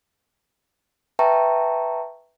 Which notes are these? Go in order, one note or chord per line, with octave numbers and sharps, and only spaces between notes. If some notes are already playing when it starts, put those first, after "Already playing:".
B4 E5 G5 A5 A#5 C#6